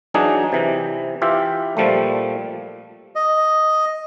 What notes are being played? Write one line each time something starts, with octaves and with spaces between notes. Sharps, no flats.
E3 F#3 D4 D#4 G#4
C3 E3
E3 F4 G4 E5
A#2 F3 G3 A3
D#5